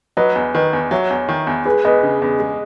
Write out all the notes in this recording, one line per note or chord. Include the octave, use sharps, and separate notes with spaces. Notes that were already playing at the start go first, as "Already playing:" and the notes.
F#3 B4 D#5
E2
D#3 B4 D#5
E2
F#3 C#5 E5
E2
D#3
E2
G#3 G#4 B4
E2 B4 D#5
C#3
E2
G#3